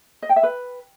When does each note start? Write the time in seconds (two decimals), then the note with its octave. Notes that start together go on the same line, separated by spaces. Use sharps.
0.22 D#5
0.29 G5
0.36 E5
0.43 B4